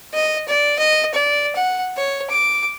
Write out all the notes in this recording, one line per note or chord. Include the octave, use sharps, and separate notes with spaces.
D#5
D5
D#5
D5
F#5
C#5
D6